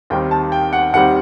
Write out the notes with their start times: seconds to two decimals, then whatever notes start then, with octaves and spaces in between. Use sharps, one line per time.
0.10 D#2 D#3 G3 C4 G5
0.31 A5
0.52 G5
0.73 F#5
0.93 D#2 D#3 G3 C4 F#5